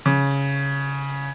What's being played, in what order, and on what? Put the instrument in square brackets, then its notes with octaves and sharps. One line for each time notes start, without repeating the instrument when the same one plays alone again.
[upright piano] C#3